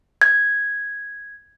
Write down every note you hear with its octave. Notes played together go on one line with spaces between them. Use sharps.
G#6